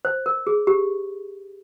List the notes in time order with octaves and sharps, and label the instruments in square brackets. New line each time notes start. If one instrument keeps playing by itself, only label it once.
[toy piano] C5
A#4
G#4
G4